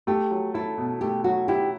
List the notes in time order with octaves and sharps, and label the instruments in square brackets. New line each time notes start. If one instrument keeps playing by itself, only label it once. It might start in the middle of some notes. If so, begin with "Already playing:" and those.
[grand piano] A3 [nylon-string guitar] G4
[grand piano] F#3
[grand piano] E4 [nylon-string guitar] A4
[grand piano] B2
[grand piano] A3 [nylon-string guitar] G4
[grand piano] F#3 [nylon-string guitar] F#4
[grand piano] E4 [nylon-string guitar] G4